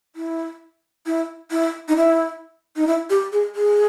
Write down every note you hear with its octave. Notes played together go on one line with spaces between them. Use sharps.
E4
E4
E4
D#4
E4
D#4
E4
G4
G#4
G#4